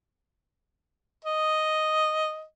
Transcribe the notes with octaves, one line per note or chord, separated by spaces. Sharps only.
D#5